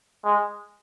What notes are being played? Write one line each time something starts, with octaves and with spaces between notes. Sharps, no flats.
G#3